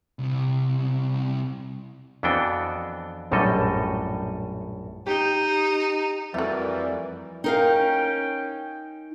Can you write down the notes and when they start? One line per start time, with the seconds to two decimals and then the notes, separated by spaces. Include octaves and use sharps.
0.19 C2 C3
2.23 F2 E3 B3 D4 F#4 G5
3.31 A#1 F#2 A2 G3 A4 D#5
5.06 D#4 G4 G6
6.34 F2 E3 G3 A3 F#4 A#4 D5 E5
7.44 C#4 D#4 A#4 F5 G5